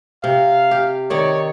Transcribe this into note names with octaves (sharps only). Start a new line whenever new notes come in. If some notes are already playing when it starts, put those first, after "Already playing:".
C3 F5
G4
D#3 C#5 D5